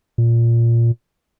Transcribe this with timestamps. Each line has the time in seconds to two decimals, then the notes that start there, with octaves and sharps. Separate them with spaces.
0.18 A#2